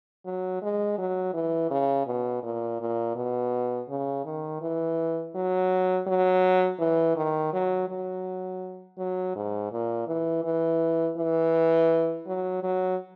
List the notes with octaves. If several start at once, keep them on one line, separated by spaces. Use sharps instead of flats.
F#3
G#3
F#3
E3
C#3
B2
A#2
A#2
B2
C#3
D#3
E3
F#3
F#3
E3
D#3
F#3
F#3
F#3
G#2
A#2
E3
E3
E3
F#3
F#3